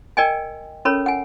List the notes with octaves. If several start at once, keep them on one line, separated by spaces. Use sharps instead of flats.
A#4 D5 D#5 G5 G#5
C#4 A4 A#4 C#5 B5
F#5 G#5